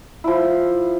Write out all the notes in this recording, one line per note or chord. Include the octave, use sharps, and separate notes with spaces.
F3 E4